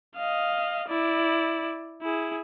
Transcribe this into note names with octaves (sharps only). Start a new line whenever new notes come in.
D#5 F5
E4 D5
E4 G#4